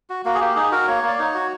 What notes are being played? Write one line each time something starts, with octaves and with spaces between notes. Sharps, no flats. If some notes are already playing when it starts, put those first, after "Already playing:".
F#4
A#3 F#4
G#4
A#3 G4
D#4 G#4
F#4 A#4
A#3 C#5
A#3 D5
D#4 C#5
F#4